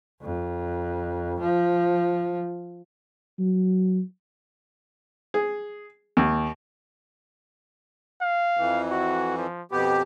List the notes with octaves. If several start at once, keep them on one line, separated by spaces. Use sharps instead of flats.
F2
F3
F#3
G#4
D#2
F5
F2 E3
F#4
F3
F2 B2 B3 G4